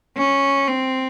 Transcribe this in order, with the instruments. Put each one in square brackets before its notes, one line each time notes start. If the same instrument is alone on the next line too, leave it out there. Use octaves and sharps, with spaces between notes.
[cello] C#4
C4